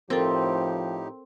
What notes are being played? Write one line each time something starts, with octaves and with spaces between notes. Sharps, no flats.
A2 F3 C4 D#4 G4 A4 A#4